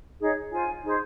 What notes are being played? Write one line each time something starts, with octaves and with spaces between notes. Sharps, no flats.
D#4 G#4 C#5
F4 C5 G#5
D#4 G#4 C5